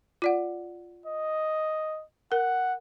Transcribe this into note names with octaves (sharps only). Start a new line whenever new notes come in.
F4 D5 F#5
D#5
A#4 F#5